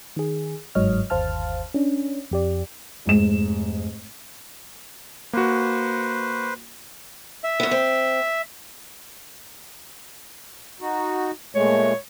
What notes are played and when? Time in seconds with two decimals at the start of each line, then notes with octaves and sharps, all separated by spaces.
0.16 D#3 G#4
0.75 G1 G#2 F#3 C#5 D#5 F6
1.10 G1 D#2 C5 F5 A5 F6
1.74 C#4 D4
2.31 F2 G4 D5
3.05 F1 G#2 E7
5.33 A#3 F#4 B4 C5
7.44 E5
7.60 F#2 B3
7.71 C4
10.81 D#4 F#4
11.55 A#2 G#3 A3 C#5